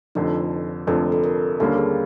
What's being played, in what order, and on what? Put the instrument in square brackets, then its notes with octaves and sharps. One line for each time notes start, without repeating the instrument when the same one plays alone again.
[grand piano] F1 F2 D3 [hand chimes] D#4
[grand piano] F1 F2 D3 [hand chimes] A4
[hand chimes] A4
A#4
[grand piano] D#2 D3 G3 A#3 C#4 [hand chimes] A4
[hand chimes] G#4